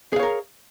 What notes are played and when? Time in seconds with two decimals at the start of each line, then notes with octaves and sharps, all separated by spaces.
0.13 G#4
0.16 F5
0.19 C#5
0.23 A#4